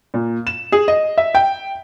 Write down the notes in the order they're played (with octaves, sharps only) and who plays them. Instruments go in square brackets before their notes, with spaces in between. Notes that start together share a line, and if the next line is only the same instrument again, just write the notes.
[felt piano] A#2
E7
G#4
D#5
E5
G5